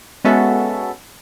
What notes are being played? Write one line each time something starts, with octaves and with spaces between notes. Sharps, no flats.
G#3 B3 C#4 F#4 A4 E5